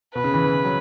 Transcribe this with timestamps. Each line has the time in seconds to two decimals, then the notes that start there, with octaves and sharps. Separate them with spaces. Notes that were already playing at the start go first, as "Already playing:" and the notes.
0.14 B2 B4
0.24 C#3
0.34 E3
0.44 E3
0.55 E3
0.64 F#3